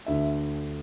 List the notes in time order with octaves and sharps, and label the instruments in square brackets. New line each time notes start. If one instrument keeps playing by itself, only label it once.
[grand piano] D2 D3 E5